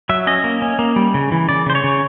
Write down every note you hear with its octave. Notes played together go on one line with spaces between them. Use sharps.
F#3 E5
C#4 D#5
A#3
C#4
A#3
G3
C#3
E3
C#3 D5
C#3 C5
C#5
C#3